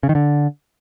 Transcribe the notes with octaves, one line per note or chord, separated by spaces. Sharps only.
C#3
D#3
D3